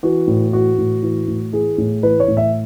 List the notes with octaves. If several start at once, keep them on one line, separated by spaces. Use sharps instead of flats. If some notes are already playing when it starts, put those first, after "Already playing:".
E3 F#4
A2
E3 F#4
A2
E3
A2
E3 G#4
A2
E3 B4
C#5
A2
E5